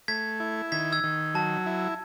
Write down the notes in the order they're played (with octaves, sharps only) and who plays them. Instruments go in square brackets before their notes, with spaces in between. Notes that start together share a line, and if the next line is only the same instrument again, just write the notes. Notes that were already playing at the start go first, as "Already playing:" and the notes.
[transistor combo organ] A3 [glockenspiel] G#6 B6
[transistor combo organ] E4
[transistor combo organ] D#3 [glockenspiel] G#6 B6
[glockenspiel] E6 G#6
[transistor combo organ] D#3
[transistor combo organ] F#3 [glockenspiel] A5
[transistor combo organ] E4